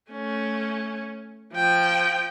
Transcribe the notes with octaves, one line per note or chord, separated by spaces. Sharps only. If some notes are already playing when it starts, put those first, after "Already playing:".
A3 C#4
F3 G5